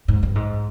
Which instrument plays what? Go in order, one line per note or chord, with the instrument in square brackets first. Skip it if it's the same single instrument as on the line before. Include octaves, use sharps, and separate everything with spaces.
[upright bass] G#2
G2
G#2